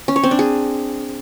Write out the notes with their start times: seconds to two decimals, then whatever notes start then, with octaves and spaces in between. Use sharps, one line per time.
0.08 C#4
0.16 C#5
0.23 C4
0.31 D4
0.39 G#4